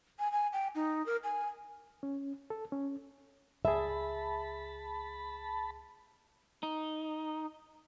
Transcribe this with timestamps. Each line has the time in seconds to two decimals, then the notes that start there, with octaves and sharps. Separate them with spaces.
0.19 G#5
0.32 G#5
0.53 G5
0.75 D#4
1.06 A#4
1.24 G#5
2.03 C#4
2.50 A4
2.72 C#4
3.65 C#2 G#4 E5 A5 B5
6.63 D#4